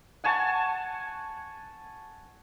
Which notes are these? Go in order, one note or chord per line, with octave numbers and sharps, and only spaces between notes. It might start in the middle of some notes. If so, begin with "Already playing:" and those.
F#5 G#5 A5 C#6